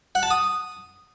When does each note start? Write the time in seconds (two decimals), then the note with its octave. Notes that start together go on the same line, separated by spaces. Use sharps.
0.15 F#5
0.23 A5
0.31 D#6